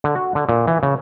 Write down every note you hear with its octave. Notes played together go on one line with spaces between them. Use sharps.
D3
F#4
D3
A#2
E3
C#3